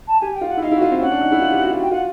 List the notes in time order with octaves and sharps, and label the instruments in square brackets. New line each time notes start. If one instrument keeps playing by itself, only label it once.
[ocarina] A5
[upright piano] G4 [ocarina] G#5
[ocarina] G5
[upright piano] F4
[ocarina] F#5
[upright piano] E4
[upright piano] D#4 [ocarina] F5
[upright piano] E4 F#4
F4
C4
[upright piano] C#4 [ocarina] F#5
[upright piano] D4
D#4
E4
F4
G4
F#4
F4
[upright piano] F#4 [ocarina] G5
[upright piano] F4 [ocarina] F#5